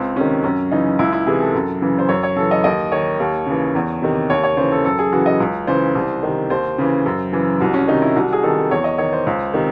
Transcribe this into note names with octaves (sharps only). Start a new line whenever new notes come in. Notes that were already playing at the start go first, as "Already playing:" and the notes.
Already playing: C#2 C4
C3 D#3 C#4
F#2 C#4
C#3 E3 D#4
C#2 E4
E4
C3 E3 G#4
A4
F#2
C#3 E3
C5
F#2 C#5
C#5
C#3 E3 A4
D#5
D#2 D#5
D#3 C#5
D#2
C#3 E3
E2
C3 D#3
D#2 C#5
C#5
C#3 E3 C5
A4
F#2 A4
G#4
C#3 E3 F#4
D#5
C#2
C#3 E3 C5
C2
C3 D#3
D#2 C5
C#3 E3
F#2
C#3 E3
C2 F#4
C#4
C3 D#3 D#4
E4
C2 F#4
G#4
C3 D#3 A4
E2 C#5
D#5
D#3 C#5
C5
C#2
C3 D#3